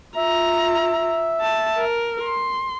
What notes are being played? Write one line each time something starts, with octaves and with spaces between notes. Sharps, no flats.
F4 E5 A#5
A5
A#4
C6